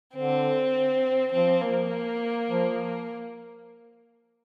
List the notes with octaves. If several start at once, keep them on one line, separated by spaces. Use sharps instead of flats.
D3 C4
F3 C4
A#3
F3